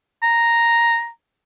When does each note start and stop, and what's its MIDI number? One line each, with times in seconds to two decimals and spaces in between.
0.22 1.08 82